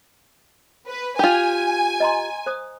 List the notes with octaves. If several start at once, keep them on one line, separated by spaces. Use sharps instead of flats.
B4
F4 G4 G#5
D#5 A#5 C6
C5 D#6